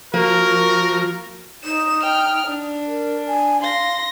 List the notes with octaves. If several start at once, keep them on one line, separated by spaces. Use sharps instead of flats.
F3 A#3 F#4 A#4
D#4 E7
G5 F6
D4
A#4
G#5
F5 C6 A#6